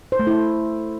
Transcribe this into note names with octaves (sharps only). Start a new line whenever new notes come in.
C5
A3
E4